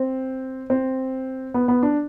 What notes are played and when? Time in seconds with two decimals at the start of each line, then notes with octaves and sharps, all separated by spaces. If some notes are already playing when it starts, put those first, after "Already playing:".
Already playing: C4
0.70 C4
1.54 B3
1.68 B3
1.83 D4